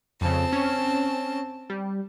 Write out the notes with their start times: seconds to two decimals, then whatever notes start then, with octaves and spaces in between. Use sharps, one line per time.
0.21 F2 C#3 C4 A5
0.53 C#4
1.70 G3